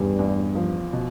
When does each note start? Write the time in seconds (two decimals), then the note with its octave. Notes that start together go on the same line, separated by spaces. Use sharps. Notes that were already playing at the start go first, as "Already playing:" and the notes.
Already playing: E2 G2
0.19 E2
0.55 F3
0.93 B2